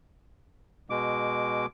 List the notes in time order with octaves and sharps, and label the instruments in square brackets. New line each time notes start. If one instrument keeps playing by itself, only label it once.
[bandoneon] B2 G#3 D6